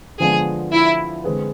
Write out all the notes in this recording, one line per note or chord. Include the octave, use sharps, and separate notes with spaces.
D3 F3 G#3 B3 D4 G#4
E4
D3 G#3 C4 G#4 B4